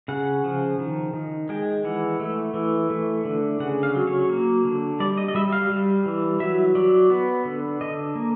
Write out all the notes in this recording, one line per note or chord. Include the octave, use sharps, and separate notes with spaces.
C#3 F#5
F3
D#3
D#3
G#3 G5
E3 F#5
A3
E3
A3
D3
C#3 F#5
F5
F#3
C#5
A#3
D3
G3 D5
D#5
D#5
G3 E5
F5
G3
E3
F#3 E5
F#3 D5
B3
D3
D3 D#5
A#3